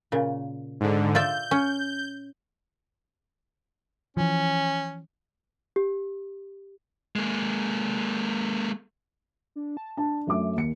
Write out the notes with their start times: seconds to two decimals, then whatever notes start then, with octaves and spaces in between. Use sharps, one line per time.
0.12 A#2 C#3
0.80 G#2 D3
1.15 F4 D5 E5 G6
1.51 C#4
4.17 E3 F3 C#4
5.76 G4
7.16 G#3 A#3
9.56 D4
9.77 A5
9.97 D4 A5
10.27 F#2 A3 D6
10.56 D#2 D#3 C#7